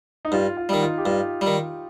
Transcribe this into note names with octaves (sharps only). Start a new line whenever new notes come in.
D#4
G2 F4
F4
D#3 G3 D#4
F4
G4
G2 F4
G3
D#3